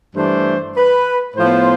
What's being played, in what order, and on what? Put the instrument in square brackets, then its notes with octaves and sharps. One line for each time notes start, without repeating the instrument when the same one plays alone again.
[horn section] G2 E3 A3 D4 C5
B4
A2 F3 B3 C5